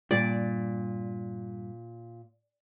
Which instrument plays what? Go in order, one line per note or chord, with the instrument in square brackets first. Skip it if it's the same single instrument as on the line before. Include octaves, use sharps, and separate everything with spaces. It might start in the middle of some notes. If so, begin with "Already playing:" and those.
[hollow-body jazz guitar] G2 [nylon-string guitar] A#2 [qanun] D5